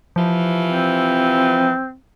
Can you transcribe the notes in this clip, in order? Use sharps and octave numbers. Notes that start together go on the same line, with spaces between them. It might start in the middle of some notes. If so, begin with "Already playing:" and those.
C3 E3 F3 F4
C4